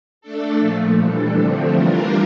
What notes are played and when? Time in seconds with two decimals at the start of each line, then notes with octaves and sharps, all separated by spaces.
0.21 A3 D4 A4
0.59 A#2 F3 A3
0.97 E3 G3 D4 A4
1.35 D3 F3 A3 C4
1.74 E3 G3 D4 F4 A#4